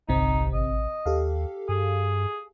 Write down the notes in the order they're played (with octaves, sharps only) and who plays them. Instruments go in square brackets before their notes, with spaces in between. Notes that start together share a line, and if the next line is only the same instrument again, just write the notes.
[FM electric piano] G1 C3 C4 [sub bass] C2 [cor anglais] D#4
[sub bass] A1 [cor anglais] D#5
[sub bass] D#2 [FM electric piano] G4 A4 F5
[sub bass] G2 [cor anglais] G#4